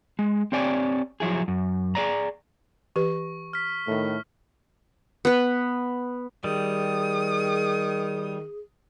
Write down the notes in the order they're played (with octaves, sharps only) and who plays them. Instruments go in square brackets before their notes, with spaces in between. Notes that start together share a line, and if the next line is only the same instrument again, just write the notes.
[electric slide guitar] G#3
C4 G4 C#5 D5 G#5
F3 F#3 E4 G#4
F#2
G#4 D5 A#5
[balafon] E3 G4 B4 [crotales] C#6
[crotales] F6 B6
[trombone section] A2 D#3 A3
[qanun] B3 B4
[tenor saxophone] D#3 [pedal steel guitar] G3 [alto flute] G#4 [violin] D#6